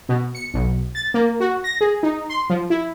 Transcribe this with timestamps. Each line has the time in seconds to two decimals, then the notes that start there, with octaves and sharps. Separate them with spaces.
0.09 B2
0.35 C#7
0.54 B1
0.95 A6
1.14 A#3
1.40 F#4
1.64 A#6
1.81 G#4
2.03 D#4
2.29 C6
2.50 F3
2.70 E4